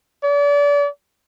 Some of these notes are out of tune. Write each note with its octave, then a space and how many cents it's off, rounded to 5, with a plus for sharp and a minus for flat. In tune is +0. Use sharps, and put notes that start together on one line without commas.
D5 -35